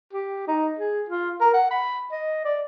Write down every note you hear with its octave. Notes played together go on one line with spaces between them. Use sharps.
G4
D#4
G#4
F4
A#4
F#5
B5
D#5
D5